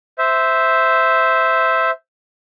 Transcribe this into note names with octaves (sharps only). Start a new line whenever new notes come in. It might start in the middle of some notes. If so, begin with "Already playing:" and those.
C5 E5